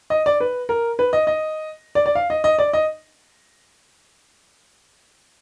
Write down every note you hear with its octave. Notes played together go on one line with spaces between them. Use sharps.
D#5
D5
B4
A#4
B4
D#5
D#5
D5
D5
F5
D#5
D#5
D5
D#5